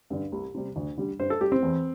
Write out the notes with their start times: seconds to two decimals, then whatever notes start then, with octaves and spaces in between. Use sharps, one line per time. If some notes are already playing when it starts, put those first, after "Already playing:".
0.10 G2 D3
0.32 C2
0.55 C3 G3
0.76 D2
0.97 D3 G3
1.19 G2 C5
1.30 A4
1.41 G3 G4
1.52 C4
1.63 E2